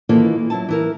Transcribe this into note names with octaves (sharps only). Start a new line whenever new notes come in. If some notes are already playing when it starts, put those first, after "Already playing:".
D#3 E3 A#3 F4 A4
F#3 E4 A5
E3 E4 A#4